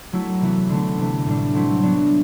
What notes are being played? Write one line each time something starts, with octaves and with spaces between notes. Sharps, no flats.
F#3 A3 E4
C3 E3 B3 E4
D3 A3 D4
C3 E3 A3
A2 G3 D4
F#3 A3 C4 E4
F#3 B3 D4